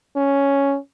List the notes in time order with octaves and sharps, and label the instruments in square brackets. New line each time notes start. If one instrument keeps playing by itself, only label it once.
[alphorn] C#4